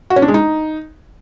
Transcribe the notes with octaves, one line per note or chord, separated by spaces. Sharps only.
F#4
C#4
D4
G#3
D#4